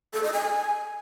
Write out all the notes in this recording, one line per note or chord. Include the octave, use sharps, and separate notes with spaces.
A4
D#5
G#5